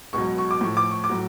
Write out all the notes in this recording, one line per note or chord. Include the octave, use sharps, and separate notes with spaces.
C#2 B2 F#3 C#6
C#6
D6
A2 F3 C#6
D6
C#6
D6
A2 F#3